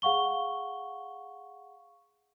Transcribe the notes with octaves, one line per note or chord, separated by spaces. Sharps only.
G#4 F5 F#5 C#6 G7